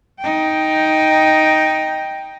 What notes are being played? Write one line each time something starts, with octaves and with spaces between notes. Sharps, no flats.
D#4 G5